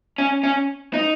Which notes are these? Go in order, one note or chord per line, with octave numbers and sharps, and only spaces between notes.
C#4
C#4
D#4